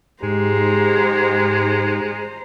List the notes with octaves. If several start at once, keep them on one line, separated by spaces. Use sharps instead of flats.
G#2 G#3 G4 C5 A#5